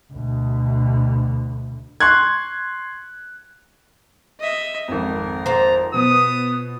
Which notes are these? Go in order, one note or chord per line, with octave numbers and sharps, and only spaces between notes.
D2 B2
C6 C#6 F#6 G#6
D#5 E5
G#1 F2 A#4
F4 C5 A#5
B2 B3 D#6